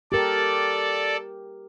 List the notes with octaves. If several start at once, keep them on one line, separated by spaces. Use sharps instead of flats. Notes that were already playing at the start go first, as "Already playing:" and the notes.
G4 A4 A#4 D5